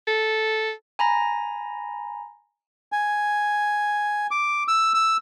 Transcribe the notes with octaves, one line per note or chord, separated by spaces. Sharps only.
A4
G#5 A#5 B5 A#6
G#5
D6
E6
E6